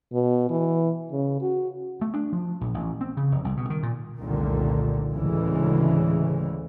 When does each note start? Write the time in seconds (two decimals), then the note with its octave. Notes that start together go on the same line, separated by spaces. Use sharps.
0.13 B2
0.50 E3
1.12 C#3
1.42 F#4
2.01 A3
2.14 D4
2.33 F3
2.61 A#1
2.74 A1
3.01 C4
3.17 C#3
3.32 F1
3.45 C2
3.57 B2
3.70 D#3
3.83 A#2
4.20 F1 C2 A#2 D3 D#3
5.12 D2 A2 C#3 E3 G#3